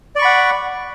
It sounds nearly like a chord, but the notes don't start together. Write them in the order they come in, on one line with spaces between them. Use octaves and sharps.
D5 C#6 B5 F#5